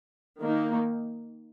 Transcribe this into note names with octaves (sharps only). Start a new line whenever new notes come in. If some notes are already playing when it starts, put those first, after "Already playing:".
D#3 A#3 D#4